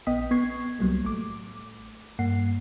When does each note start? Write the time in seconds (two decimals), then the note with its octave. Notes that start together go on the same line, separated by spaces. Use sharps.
0.07 A#1 B3 D#5 G5 D#6 B6
0.31 B3 C#6 G#6 C7
0.79 C2 F#3 G3 A#3
1.03 A1 A3 D6
2.19 G2 A#3 F#5 C7